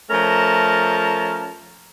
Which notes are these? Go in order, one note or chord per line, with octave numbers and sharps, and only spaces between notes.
F3 A3 C#4 A#4 A5 A#5